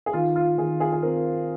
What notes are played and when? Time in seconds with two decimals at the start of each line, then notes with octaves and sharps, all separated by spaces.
0.06 G#4
0.13 D#3 F4
0.36 F4
0.57 D#3 G#4
0.80 G#4
0.93 G#4
1.03 C4 A#4